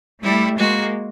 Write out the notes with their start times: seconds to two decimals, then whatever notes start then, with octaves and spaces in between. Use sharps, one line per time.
0.22 G3 A3 E4
0.58 G#3 A#3 F#4